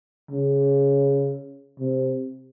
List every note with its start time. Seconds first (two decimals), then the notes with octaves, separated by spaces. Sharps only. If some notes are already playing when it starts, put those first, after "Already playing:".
0.31 C#3
1.80 C3